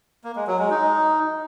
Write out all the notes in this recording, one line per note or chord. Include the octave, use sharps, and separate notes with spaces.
A#3
G#3
F#3
G#3
D#4